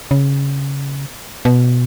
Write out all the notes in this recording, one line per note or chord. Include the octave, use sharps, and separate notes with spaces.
C#3
B2